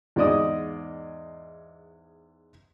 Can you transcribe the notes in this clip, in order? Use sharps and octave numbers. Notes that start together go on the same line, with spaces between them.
E2 G#2 D5 D#5 D#6